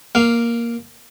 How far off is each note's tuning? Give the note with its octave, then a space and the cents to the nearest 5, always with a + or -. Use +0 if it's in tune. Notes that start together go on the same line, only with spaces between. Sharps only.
A#3 +5 F5 -5